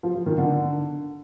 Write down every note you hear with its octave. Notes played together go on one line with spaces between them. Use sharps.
F3
F3
D#3
D3